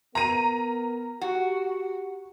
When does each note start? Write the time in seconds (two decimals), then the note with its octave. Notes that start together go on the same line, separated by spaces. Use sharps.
0.15 B3 A#4 A#5 D#7
1.21 F#4 G4